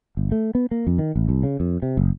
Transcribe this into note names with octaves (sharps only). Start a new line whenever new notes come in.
G1
A3
B3
A#3
F2
D#3
A1
C2
C#3
F2
C3
F#1